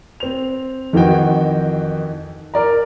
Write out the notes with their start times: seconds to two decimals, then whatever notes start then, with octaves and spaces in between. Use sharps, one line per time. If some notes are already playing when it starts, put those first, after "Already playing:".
0.20 C4 F7
0.93 F2 D#3 E3 F#4 G5
2.54 A#4 D5 A#5